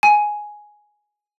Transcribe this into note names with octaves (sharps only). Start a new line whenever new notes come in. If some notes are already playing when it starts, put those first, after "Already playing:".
G#5